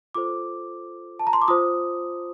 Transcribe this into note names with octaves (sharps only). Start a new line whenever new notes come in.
F4 A4 C5 D6
A5
A#5
C6
D6
F4 C5 D#6